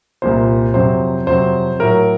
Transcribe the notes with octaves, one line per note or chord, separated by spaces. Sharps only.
C2 A#2 F3 C5
F2 C3 F#3 C5
F2 C3 F#3 C5
A2 F#3 A#4